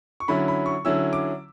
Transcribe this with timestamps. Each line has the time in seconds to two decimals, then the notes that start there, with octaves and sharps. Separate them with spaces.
0.20 C#6
0.28 D3 F#3 C#4 E4 B5
0.48 B5
0.66 C#6
0.85 D3 F#3 C#4 E4 E6
1.13 D6